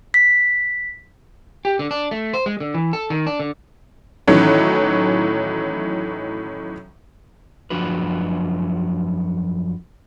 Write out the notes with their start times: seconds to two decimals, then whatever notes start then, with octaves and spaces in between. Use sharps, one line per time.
0.14 B6
1.65 G4
1.79 D3
1.91 D4
2.11 A3
2.34 C5
2.46 G#3
2.60 D3
2.74 E3
2.93 A4
3.10 D#3
3.26 D4
3.40 D3
4.27 A2 D#3 E3 F#3 C#4
7.70 F#2 F3 D4 F#4 B4